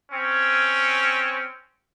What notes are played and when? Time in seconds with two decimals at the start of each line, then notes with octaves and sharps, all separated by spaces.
0.11 C4 C#4